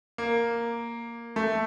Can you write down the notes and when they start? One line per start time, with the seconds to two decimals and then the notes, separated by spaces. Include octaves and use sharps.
0.18 A#3
1.36 A3